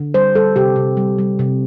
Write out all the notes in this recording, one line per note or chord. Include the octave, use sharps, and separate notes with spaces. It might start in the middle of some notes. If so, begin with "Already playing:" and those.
Already playing: D3
G3 C5
G3 A4
C3 G4
C3
G3
G3
C3